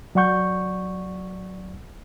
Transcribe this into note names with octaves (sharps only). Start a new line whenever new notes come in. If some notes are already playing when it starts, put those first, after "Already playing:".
F#3 D5 F#5 C#6 G6